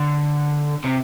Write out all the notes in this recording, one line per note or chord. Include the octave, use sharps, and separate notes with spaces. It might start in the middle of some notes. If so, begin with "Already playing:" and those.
Already playing: D3
C3